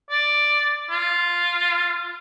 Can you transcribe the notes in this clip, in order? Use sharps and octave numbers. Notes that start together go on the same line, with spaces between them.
D5
F4